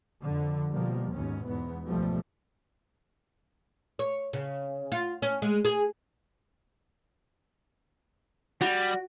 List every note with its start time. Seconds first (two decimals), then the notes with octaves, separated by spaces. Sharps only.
0.21 F2 D3
0.71 B2 F3 G3 A#3
1.11 D#2 G#2 B2 C#4
1.45 E2 G#2 B3
1.86 C#2 G#2 B2 F3 G3 A3
3.99 C#5
4.33 C#3
4.92 F4
5.22 C#4
5.42 G#3
5.65 G#4
8.61 G3 F#4